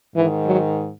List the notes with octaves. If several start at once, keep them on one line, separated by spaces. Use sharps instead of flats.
G#2 D#3 E3
F#3